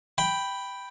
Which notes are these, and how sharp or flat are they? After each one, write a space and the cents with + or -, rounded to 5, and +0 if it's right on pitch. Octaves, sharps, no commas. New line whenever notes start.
G5 +0 B5 +0